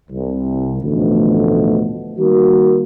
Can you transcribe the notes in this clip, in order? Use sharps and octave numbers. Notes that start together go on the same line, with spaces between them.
C2
A1 D2 B2 F3 A3
D#3 G3 A#3 F#4